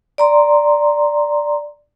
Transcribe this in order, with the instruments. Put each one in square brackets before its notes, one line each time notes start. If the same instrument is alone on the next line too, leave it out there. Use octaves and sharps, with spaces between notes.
[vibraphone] D5 A#5 C6